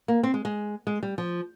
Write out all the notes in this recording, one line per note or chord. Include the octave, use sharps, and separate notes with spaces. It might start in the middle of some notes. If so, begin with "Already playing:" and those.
A#3
C4
G#3
G#3
G#3
G3
F3